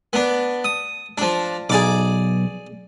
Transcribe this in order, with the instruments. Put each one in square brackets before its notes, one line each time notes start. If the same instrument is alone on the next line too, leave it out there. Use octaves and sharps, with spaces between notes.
[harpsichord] B3 D4
D#6
F3 D4
[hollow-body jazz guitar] B1 [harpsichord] G#4 D5 D6